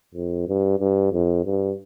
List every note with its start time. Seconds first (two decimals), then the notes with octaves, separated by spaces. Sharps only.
0.14 F2
0.48 G2
0.79 G2
1.12 F2
1.44 G2